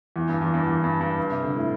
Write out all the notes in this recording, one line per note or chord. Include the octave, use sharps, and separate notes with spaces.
E2
G2
E2
G2
E2
G2
G2
G2
C3
D3
A2